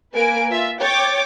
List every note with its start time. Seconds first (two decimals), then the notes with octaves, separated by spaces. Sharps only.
0.14 A#3 B4 G#5 D7
0.50 F4 E5
0.80 C#5 G5 D6 A6